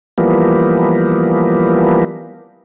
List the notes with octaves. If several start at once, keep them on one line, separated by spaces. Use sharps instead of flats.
E3 F3 G3 A#3 B3